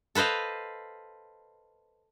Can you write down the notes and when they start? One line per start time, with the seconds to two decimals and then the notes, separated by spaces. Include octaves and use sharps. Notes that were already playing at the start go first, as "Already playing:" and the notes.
0.15 A4 B4 C5 D#5 F5